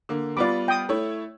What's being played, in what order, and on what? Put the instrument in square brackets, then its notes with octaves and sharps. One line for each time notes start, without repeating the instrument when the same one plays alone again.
[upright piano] D3 A#3
[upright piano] G3 B3 F4 [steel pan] D5 D6
[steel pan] G5 D#6
[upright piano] A3 E4 C#5